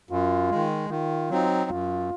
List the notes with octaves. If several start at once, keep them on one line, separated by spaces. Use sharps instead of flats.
F#2 F4
D#3 G#3
D#3 F4
F#3 C4 D#4
F#2 F4